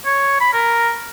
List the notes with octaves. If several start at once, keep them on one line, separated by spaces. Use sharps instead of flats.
C#5
B5
A#4